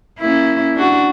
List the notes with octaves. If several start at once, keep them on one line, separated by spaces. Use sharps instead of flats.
A#3 C#4 E4
D4 F#4